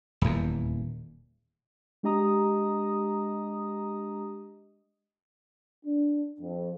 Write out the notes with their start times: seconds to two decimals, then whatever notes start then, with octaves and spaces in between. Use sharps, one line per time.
0.22 D#1 E2
2.03 G#3 D4 G4 D#5 A#5 D#6
5.85 D4
6.40 F2